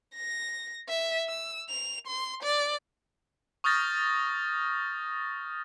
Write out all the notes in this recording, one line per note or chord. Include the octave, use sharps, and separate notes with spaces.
A#6
E5
E6
F7
C6
D5
C#6 D#6 F6 G6 A6 A#6